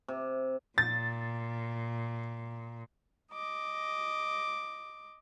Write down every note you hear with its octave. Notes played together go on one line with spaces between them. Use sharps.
C3
A#2 A6
D#5 D6